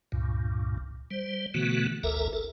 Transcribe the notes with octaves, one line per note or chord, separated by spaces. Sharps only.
C#2 G2 A#2
G3 C5
B2 D3 E3 A3 B3 F#4
G#1 D2 A4 A#4 E5 A#5
A4 A#4